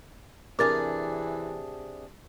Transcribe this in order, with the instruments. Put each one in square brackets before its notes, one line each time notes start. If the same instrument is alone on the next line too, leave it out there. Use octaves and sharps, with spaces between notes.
[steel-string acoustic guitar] C3 D4 G#4 [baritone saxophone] E3 [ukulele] A#4 [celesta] D6 A6